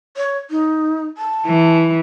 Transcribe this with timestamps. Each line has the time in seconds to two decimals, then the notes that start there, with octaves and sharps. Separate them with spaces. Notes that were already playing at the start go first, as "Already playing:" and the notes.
0.17 C#5
0.51 D#4
1.18 A5
1.47 E3